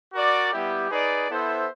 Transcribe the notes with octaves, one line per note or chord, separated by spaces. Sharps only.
F#4 A#4 D5
G3 B3 E4 G4
D#4 G#4 B4 D5
B3 E4 A4 C5 E5